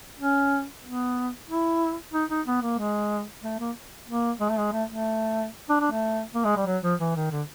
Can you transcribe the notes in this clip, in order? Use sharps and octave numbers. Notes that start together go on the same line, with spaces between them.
C#4
B3
E4
D#4
D#4
B3
A#3
G#3
A3
A#3
A#3
G#3
A3
G#3
A3
A3
D4
D4
A3
A#3
G#3
G3
F#3
F3
E3
D#3
D3